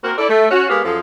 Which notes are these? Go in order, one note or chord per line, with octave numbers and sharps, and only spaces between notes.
A#3 C4 F#4 A#4
E4 A4 D5
A3
C#4 F#4
G#3 A#3 B3 G4 F5
F#2 F3 G#4 A4